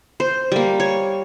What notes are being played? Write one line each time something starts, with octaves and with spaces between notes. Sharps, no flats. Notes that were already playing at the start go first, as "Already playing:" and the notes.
C5
G3 A#3
C#5